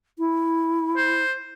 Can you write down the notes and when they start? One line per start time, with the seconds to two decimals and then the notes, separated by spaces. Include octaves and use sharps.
0.19 E4
0.97 C5